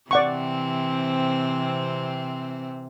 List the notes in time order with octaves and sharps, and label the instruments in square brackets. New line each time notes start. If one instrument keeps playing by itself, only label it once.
[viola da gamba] C3 E3 C4 [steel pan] D5 F#5 C#6